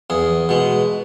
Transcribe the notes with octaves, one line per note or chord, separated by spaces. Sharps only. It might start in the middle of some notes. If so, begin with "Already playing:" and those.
E2 G#4
B2 G#3